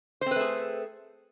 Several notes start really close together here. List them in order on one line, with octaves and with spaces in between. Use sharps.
C5 C4 B4 A3 G#4